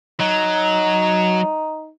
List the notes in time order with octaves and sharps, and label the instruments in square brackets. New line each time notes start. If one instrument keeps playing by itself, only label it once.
[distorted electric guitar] F#3 [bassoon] D#4